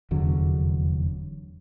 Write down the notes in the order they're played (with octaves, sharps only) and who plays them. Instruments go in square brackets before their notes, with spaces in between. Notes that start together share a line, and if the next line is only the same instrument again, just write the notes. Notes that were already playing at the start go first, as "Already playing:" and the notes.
[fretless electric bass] F1 E2 D3 F#3